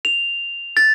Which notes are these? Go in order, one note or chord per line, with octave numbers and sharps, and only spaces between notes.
F7
A6